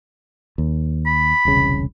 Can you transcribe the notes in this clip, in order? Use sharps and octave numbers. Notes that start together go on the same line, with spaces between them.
D#2
B5
E1 C2 C#3